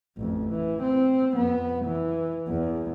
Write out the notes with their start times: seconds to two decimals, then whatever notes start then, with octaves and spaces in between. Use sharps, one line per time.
0.17 A1 F2
0.51 E3
0.83 C4
1.34 F2 B3
1.86 E3
2.48 E2